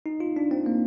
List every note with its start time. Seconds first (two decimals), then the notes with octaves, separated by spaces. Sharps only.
0.06 D#4
0.20 F4
0.36 D4
0.51 C4
0.66 A#3